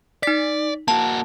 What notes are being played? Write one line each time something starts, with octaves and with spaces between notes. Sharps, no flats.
D#4 D5 B6
A#3 F#4 A5